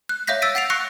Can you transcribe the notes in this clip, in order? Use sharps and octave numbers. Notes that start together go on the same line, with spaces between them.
F#6
C#5 E5 F5 G6 A#6 B6
E6 A6 B6 D7 D#7
F#5 A6 C7 D7 F7
C#6 F#6 A#6 C7 C#7